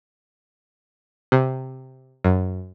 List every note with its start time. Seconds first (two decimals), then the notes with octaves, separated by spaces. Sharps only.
1.32 C3
2.24 F#2